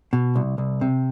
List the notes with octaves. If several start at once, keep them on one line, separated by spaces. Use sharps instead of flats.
B2
C2
C2
C3